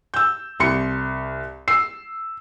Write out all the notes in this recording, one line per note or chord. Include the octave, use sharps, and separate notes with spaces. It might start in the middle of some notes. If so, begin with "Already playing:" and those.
E6 G6
C2 C6 C#7
E6 C7